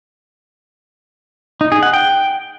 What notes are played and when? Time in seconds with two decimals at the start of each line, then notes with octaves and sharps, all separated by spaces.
1.61 D#4
1.72 G#4
1.83 F#5
1.93 G5